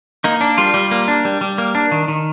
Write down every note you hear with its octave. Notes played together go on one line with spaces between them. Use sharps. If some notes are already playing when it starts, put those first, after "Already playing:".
A#3 D#4
D4
G3 F4
G3
A#3
D4
G3
G3
A#3
D4
D#3
D#3